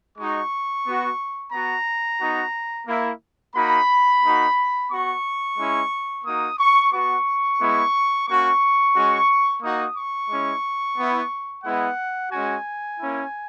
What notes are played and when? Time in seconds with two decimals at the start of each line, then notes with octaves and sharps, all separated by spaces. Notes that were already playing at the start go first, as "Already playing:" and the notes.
0.17 G#3 D#4 F#4 C#6
0.85 B3 F#4
1.53 B3 F#4 A#5
2.20 B3 D#4 F#4
2.87 A#3 E4
3.55 A#3 D#4 F#4 B5
4.22 A#3 D#4 F#4
4.90 B3 F#4 C#6
5.57 G#3 C#4 E4
6.24 A#3 D#4 F#4 D#6
6.58 C#6
6.92 B3 F#4 C#6
7.59 G#3 B3 E4
8.27 A#3 C#4 F#4 C#6
8.94 G#3 C#4 F#4
9.61 A#3 D#4 F#4 D#6
9.96 C#6
10.29 G#3 C#4 E4
10.97 B3 E4
11.64 G#3 B3 E4 F#5
12.31 G#3 C#4 F#4 G#5
12.99 A#3 C#4 E4